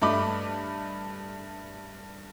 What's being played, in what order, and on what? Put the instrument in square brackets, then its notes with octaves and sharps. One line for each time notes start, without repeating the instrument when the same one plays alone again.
[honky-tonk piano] G2 A3 D#5 B5 D6